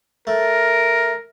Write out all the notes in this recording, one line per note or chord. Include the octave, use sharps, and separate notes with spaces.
A3 A#4